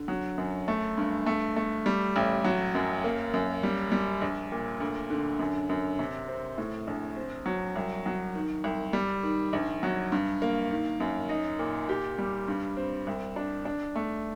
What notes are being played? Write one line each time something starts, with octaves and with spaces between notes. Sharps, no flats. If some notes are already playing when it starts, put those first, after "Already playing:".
Already playing: D3
F#3
F#2
A3
G2
A3
A3
G3
A1
F#3
F#2
A#3
F#2
G3
G3
A#1
A#2
D2
D3
F#2
F#2
C3
C4
A2
A#1
C4
F#3
C2
F#3
D#3
C2
G3
D#3
A#1
F#3
G2
A#3
D#3
F#2
D#4
A#2
G4
G3
G2
C4
C2
D4
D4
A3